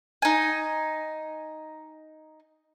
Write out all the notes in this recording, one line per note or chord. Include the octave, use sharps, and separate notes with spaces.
D#4 G#5